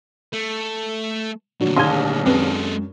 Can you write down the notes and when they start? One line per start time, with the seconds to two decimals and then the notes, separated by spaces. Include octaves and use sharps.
0.33 A3
1.60 D2 A#2 F#3 D4 F#4
1.76 A#1 D#2 A5 C6 G#6 D#7 G7
2.26 F#2 G#3 C4 A4 B4